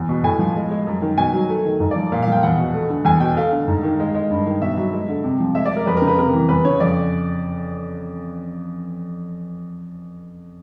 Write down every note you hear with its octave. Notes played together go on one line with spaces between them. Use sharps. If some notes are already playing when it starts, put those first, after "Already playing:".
Already playing: E2
B2
A2 G#5
F3
G#3
G#3
F#2
D#3
B2 G#5
F#3
A3
D#3
G#2
D5
F3
A#2 F5
F5
F3 G5
E2 F#5
B2
A3
D3
E2 G#5
B2 G5
A3 F5
D3
G#2
D#3
G#3
G#3
G2
D#3
B2 E5
F#3
G#3
D3
C3
F3
G#3 E5
D5
G#3
A#4
F2 B4
A#4
C#3
B4
C3 A#4
E3
E2 B4
C#3 C#5
F2 D5